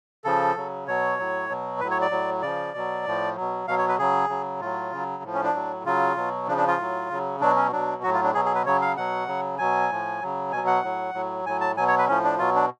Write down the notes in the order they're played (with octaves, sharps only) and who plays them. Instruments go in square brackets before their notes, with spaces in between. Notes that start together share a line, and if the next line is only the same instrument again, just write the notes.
[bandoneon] C#3 F3 A4
C#3 F#3
B2 F#3 C#5
A2 F#3
B2 F#3
A2 F#3 B4
C#5
D5
A2 F#3
C#3 F3 D5
B2 F#3
A2 F3
B2 F#3
B2 F#3 F5
C#5
B4
C#3 F#3 G#4
C#3 F#3
A2 F#3 F4
C#3 F#3
A2 F3
C#4
D4
A2 F#3
C#3 F#3 F4
B2 F#3
C#3 F3 D4
D4
F4
A2 F#3
C#3 F#3
B2 F#3 D4
C#4
B2 F#3 D4
A2 F#3 F#4
F4
D4
B2 F#3 G#4
G#4
B4
C#3 F#3 C#5
F5
B2 F#3 F#5
C#3 F#3
B2 F#3 G#5
A2 F3
C#3 F#3
B2 F#3 G#5
F#5
A2 F#3
A2 F#3
A2 F#3 G#5
A5
B2 F#3 G#5
C#5
B4
A2 F3 C#4
D4
B2 F#3 F4
D4